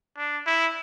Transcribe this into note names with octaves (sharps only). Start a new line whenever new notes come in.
D4
E4